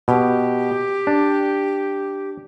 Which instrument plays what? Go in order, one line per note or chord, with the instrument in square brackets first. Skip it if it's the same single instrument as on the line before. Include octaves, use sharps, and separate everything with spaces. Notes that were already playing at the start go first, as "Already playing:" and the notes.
[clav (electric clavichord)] B2 [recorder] G4
[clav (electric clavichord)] D4